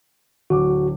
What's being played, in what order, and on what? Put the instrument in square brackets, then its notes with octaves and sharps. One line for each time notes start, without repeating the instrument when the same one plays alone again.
[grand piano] D1 D6 [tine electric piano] F#4